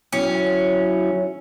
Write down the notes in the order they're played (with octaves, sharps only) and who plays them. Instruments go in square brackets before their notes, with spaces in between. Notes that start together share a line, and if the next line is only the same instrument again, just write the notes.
[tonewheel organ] F#3 E4 [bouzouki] C#4